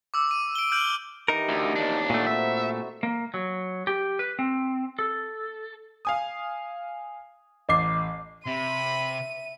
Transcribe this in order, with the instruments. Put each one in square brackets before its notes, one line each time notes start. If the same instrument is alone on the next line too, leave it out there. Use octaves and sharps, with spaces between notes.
[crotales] D6 E6
D#7
D7 G7
F6 G6 D7 F#7
[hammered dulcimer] E3 G4 [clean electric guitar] D#4 A#4
[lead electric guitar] D2
[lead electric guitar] D#2 D4 [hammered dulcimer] D5 F5 G5
[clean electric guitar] A#2 A3 [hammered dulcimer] F#4
[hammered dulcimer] C4 D#4 E4 [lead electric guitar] E5
[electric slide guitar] A#3
F#3
G4
B4
C4
A4
[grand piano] F5 G#5 D#6
[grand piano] A1 C7 [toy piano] D#5 D6
[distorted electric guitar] C3 [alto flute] E5 [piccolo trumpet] B5 [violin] D#7